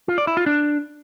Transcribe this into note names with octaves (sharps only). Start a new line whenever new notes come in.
F4
D5
E4
F4
D4